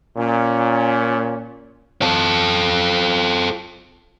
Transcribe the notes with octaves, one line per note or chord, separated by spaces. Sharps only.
A#2 C#4
F4 A4